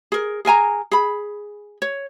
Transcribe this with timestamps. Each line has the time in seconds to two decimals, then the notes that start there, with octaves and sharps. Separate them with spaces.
0.12 G#4 A#4
0.45 G#4 A#4 G#5 A#5
0.91 G#4 B5
1.82 C#5